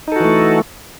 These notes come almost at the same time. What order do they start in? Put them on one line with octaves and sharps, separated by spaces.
D#4 A4 F#4 E3 A3